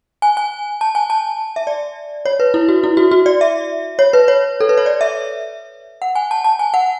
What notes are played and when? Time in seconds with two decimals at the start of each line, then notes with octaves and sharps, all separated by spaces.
0.22 G#5
0.37 G#5
0.81 A5
0.95 G#5
1.10 A5
1.56 E5
1.67 D5
2.25 C#5
2.40 B4
2.54 E4
2.69 F#4
2.84 E4
2.97 F#4
3.11 F#4
3.26 D5
3.41 E5
3.99 C#5
4.13 B4
4.28 C#5
4.60 A4
4.69 B4
4.78 C#5
4.86 D5
5.01 E5
6.02 F#5
6.15 G#5
6.31 A5
6.44 A5
6.59 G#5
6.74 F#5